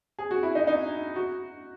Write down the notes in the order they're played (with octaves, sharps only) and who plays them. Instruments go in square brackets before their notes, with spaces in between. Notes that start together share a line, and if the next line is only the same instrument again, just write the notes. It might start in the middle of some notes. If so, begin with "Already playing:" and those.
[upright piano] G#4
F#4
E4
D#4
D#4
F#4